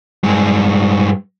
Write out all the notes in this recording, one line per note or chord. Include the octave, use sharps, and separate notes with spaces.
G2 G#3